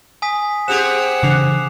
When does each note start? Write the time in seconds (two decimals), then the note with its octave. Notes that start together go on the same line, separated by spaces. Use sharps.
0.22 G#5 D#6 B6
0.68 C4 G4 G#4 F#5 E7
1.23 C#3 E3 D4 D6 C7 F7